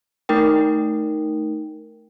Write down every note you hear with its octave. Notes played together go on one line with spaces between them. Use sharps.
A3 D#4 A#4 G5